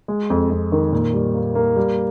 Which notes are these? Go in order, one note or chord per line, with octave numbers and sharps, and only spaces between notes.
G#3
F2
F2
D#3
A#2
G3
A#3
A#3
G3